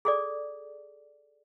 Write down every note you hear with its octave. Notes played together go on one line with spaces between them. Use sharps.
G#4 A4 D5